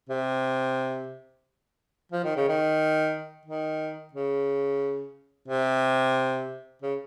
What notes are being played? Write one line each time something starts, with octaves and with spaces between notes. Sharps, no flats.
C3
F3
D#3
C#3
D#3
D#3
C#3
C3
C#3